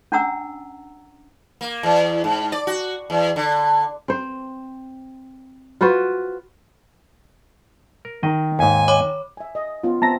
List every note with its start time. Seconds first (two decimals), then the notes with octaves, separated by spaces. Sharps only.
0.12 C#4 D4 F#5 A#5 E6
1.61 A#3
1.83 E2
2.24 G#2
2.52 D5
2.67 F#4
3.10 E2
3.36 D3
4.08 C4 C5
5.81 F4 F#4 B4 C5
8.05 A#4
8.23 D#3 D#5
8.59 D#2 G#2 G#5
8.88 C#5 B5 D6
9.37 E5 G#5
9.55 D#5
9.84 B3 C#4 F4
10.02 B3 C4 E5 A5 A#5 A#6